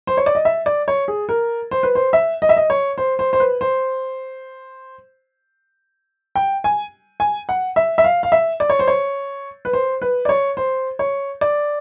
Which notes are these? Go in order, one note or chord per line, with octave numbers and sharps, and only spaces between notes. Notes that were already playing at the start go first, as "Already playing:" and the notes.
C5
C#5
D5
D#5
E5
D5
C#5
G#4
A#4
C5
B4
C5
E5
D#5
E5
D#5
C#5
C5
C5
C5
B4
C5
G5
G#5
G#5
F#5
E5
E5
F5
F5
E5
D5
C#5
C5
C#5
B4
C5
B4
D5
C#5
C5
C#5
D5